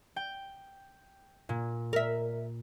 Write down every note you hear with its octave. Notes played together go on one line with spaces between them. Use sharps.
G5
A#2
A#4 E5